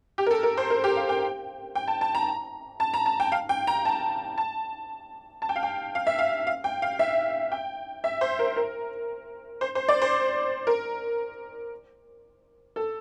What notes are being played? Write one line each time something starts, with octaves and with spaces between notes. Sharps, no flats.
G4
A#4
A4
A#4
C5
A#4
G4
F5
G5
G5
A5
A5
A#5
A5
A#5
A5
G5
F5
G5
A#5
A5
A5
A5
G5
F5
G5
F5
E5
F5
F5
G5
F5
E5
G5
E5
C5
A#4
A#4
C5
C5
D5
C5
A#4
A4